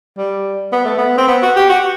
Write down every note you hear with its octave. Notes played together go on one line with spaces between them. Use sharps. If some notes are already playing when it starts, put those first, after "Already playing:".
G3
B3
A3
B3
C4
B3
F#4
G4
F#4